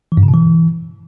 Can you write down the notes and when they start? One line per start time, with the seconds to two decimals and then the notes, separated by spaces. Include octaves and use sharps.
0.12 E3
0.17 G2
0.23 C#3
0.28 B2
0.34 E3